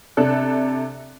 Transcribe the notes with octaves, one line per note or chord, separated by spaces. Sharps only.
C3 D4 A4 F#6